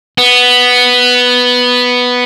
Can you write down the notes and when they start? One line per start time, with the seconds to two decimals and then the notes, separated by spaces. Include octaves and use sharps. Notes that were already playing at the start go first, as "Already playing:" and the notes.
0.18 B3